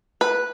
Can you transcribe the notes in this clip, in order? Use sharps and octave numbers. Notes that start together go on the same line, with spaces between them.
B4